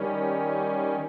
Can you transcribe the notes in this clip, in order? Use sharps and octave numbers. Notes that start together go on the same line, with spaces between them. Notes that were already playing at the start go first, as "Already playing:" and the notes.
Already playing: D#3 G3 C#4